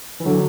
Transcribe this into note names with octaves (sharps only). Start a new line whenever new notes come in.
E3
D3 F#3